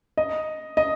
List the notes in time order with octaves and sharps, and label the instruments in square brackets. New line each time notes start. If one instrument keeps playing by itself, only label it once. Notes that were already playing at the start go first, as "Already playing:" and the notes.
[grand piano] D#5
D#5